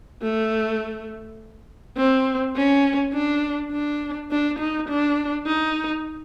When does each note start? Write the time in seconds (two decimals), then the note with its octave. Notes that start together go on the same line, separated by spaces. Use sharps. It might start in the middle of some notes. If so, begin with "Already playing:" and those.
0.22 A3
1.97 C4
2.56 C#4
3.13 D4
3.72 D4
4.31 D4
4.59 D#4
4.89 D4
5.46 D#4